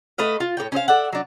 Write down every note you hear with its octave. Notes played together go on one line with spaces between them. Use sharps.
A3 B4 D#5 F5
F4
A2 A#3 C#5 G5
C#4 C5 D#5 F5
A4 D5 E5 F#5
F#3 D4